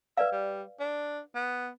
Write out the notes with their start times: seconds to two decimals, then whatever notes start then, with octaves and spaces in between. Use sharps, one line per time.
0.17 B4 D5 E5 F5
0.32 G3
0.80 D4
1.35 B3